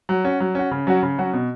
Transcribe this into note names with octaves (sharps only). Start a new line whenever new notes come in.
F#3
C#4 F#4
F#3
C#4 F#4
C#3
F#3 C#4 F#4
C#3
F#3 C#4 F#4
B2